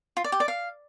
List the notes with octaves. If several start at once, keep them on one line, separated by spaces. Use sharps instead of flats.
F4
D5
G4
D5
F5